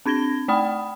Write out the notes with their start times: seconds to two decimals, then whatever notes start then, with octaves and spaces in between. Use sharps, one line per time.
0.06 C4 D4 G#6 A#6 G7
0.48 A3 D5 G5 B5 D#6